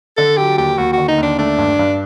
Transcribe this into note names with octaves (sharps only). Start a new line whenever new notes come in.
D3 A4
F#3 G4
D#2 G4
D#2 F#4
D3 F#4
D#4
D#2 D4
A3 D4
G2
G2